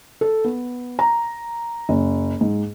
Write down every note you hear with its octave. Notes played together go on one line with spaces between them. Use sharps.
A4
B3
A#5
F#1
G#2